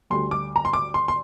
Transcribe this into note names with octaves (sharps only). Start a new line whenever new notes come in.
D2 D3 G3 C6
D6
A#5
C6
D6
C6
C6